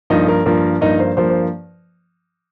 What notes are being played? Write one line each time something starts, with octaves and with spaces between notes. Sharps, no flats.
G2 F3 A#3 D#4 D#5
A#4
G2 F3 A#3 A#4
G2 F3 A#3 D#4 D#5
C5
G2 F3 A#3 C5
C5